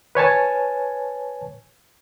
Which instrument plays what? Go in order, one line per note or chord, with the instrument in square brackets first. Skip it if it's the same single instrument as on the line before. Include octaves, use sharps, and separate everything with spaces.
[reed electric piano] B4 C#5 G#5 A5